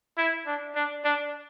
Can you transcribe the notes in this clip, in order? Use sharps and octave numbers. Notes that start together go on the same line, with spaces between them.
E4
D4
D4
D4